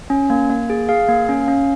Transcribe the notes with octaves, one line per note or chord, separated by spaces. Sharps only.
C#4
A#3
A#3
G#4
G#4 F5
A#3
C#4
C#4